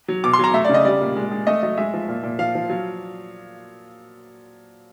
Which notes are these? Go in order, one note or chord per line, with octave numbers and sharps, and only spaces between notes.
F#3
B2 D6
C6
F#3 A#5
A3 E5
D5
C#3
D#5
G3 D5
A#2
G#3
G#3
A3 D#5
F#3 D#5
G#3 E5
F3
A#2
A#2
F3 F5
F3
F#3